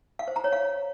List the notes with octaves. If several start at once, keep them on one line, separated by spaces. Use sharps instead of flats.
F5
C5
A#5
C#5
F5